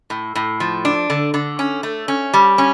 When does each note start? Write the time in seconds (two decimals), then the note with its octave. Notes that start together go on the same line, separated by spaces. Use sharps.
0.10 A2
0.35 A2
0.60 F3
0.85 D4
1.10 D3
1.34 D3
1.59 C#4
1.83 A3
2.08 C#4
2.33 G3
2.58 C#4